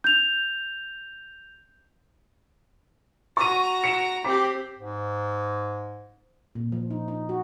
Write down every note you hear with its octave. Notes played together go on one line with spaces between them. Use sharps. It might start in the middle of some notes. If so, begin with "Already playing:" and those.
G6 F7
F#4 A#5 C#6 D#7
C#7 D7 E7
C4 G4 D6 B6
G#2
A#2
F3
D#4
D#4
F#4